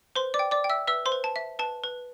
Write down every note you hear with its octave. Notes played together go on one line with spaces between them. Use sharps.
B4 C5 C6
D5 D6
G5
D5 D6
G5
E5 E6
B4 E5 E6
C5 C6
B4
A5
E5
B4 A5
B4